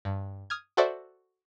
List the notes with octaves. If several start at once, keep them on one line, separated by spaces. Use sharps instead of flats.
G2
D#6 F6 G#6
F#4 A4 C5 D5 E5